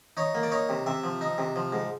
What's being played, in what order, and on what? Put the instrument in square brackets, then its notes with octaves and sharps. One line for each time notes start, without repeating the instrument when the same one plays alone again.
[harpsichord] D#4 C#5
A#3
D5
D#4 C#5
C3
C3 E5
F3
D#4
C3
F3
G#2